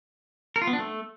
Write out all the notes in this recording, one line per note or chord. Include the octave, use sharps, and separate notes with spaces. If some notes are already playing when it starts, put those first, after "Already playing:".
A#4
F4
B3
D4
A3